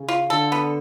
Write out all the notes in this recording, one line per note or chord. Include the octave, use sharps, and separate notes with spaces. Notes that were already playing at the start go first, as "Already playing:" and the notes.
Already playing: C#3
F4
D3 A4
B3